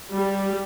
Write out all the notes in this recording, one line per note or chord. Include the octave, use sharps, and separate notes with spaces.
G3